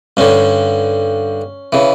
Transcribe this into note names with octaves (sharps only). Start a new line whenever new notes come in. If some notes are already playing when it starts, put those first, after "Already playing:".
G2 D3 C#4
C#3 E3